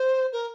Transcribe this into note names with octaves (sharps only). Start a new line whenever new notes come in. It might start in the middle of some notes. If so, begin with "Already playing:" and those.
Already playing: C5
A#4